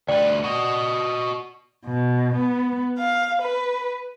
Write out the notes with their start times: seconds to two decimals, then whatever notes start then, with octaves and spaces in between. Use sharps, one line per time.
0.08 D2 B4 D5 G5
0.44 F#4 D#5
1.84 B2
2.35 B3
2.97 F5
3.41 B4